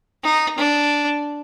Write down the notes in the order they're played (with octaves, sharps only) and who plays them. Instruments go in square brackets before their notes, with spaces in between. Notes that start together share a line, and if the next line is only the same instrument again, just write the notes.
[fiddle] D#4
D4